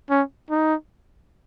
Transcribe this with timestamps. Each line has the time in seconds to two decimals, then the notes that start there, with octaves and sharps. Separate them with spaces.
0.10 C#4
0.50 D#4